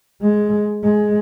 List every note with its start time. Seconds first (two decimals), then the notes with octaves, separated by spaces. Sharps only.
0.22 G#3
0.84 G#3